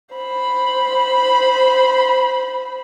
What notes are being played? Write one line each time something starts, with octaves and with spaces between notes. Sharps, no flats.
C5 B5